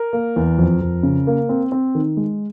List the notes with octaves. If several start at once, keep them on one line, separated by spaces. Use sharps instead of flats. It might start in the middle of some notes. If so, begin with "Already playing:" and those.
Already playing: A#4
A#3
E2
F2
F2
C#3
A#3
C4
C4
D#3
G#3